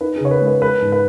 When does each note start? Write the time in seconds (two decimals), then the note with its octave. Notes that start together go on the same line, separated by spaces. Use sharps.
0.01 D#4 B4
0.16 G#4
0.20 C#3 C#5
0.31 B4
0.41 G#3
0.47 B4
0.62 G#3 B4
0.82 G#2
0.92 B4